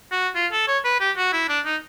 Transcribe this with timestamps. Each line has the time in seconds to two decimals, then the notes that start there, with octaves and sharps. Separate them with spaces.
0.12 F#4
0.35 F4
0.52 A4
0.67 C#5
0.84 B4
1.00 G4
1.16 F#4
1.33 E4
1.48 D4
1.65 D#4